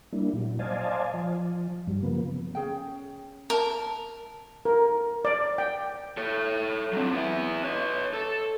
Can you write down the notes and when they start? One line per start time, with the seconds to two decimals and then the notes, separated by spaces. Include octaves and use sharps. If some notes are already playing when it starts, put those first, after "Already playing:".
0.13 G3 A#3 D4 E4
0.33 A#2 F#3
0.59 C5 D5 D#5 F5 G#5 A5
1.14 F3
1.87 G2 F#3 G3
2.03 C#3 F3 A#3 B3
2.55 C#4 G#4 G5
3.50 A#4 E5 A5
4.65 A#4
5.25 D5
5.58 G5
6.17 A4 C#5
6.93 F#3 C4
7.13 B3 E4
7.65 B4 C#5
8.13 A4